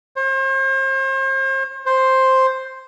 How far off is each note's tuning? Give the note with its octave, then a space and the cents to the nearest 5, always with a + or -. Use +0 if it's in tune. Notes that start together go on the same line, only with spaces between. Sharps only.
C5 +40
C5 +5